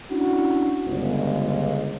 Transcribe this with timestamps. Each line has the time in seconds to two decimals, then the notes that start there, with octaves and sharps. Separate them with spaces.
0.11 C#4 D4 E4 F#4
0.86 G1 C#2